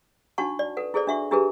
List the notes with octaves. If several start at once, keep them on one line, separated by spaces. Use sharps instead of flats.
D4 D#4 F#4 F#5 A5 C#6
D5
A4 B4 F#5
E4 G#4 A4 C5 D5
D4 F#4 E5 F#5 C#6
D4 E4 G4 G#4 A#4 B4